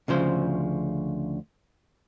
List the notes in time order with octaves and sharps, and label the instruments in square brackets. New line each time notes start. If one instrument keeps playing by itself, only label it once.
[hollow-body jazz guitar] D2 C#3 F3 C5